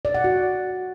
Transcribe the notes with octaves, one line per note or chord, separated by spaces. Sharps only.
D5
F#5
F#4